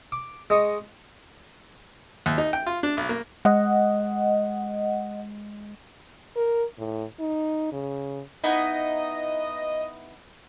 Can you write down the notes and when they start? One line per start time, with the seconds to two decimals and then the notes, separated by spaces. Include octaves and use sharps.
0.12 D6
0.50 G#3 D#5 C#6
2.26 D#2
2.38 D#4
2.53 G5
2.67 F4
2.83 D4
2.97 B1
3.09 A#3
3.45 G#3 D#5 F#5
6.36 A#4
6.79 A2
7.20 D#4
7.72 C#3
8.44 B3 D#4 E4 D#5